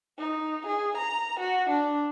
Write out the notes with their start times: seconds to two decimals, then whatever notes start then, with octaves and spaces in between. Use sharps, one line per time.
0.19 D#4
0.66 G#4
0.97 A#5
1.39 F#4
1.69 D4